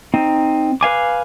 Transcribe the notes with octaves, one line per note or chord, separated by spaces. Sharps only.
C4 D#4
B4 F5 G#5 D6